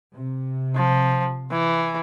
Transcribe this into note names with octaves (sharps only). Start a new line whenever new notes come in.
C3
F3
E3